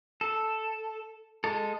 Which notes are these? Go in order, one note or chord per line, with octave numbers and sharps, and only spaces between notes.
A4
G#3 A4